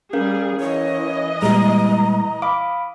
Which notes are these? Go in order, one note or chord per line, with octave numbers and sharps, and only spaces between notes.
G3 C#4 G#4 A#4 F5
E3 C#5 D#5
A#2 G3 G#3 A#5 D#6
F5 B5 D6 D#6